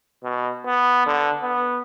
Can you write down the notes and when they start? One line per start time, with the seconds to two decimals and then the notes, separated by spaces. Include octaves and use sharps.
0.24 B2
0.66 B3
1.07 D3
1.43 B3